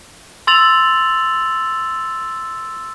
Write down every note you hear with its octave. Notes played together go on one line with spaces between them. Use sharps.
C6 E6 A6 F7 F#7